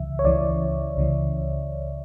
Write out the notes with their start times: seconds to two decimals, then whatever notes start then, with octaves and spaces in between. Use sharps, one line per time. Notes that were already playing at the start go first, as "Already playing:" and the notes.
Already playing: C#2 C#3 E3 E5
0.19 C#5
0.24 C#2 C#3 E3 D5
0.97 C#2 C#3 E3